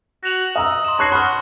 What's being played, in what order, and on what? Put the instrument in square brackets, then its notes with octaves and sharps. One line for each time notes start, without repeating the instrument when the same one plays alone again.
[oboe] F#4 [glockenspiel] A#6 F7 F#7
[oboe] D#5 [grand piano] F5 A#5 E6
[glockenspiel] C6 E7
[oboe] C#5 [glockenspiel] A5 A#6 [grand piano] C#6 F#6 C7
[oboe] F#5 [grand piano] B5 D#6 [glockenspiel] C#6 F6
[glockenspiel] G7